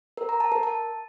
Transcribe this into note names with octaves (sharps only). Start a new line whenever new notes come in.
A#4
A#5
A5
A#4
A5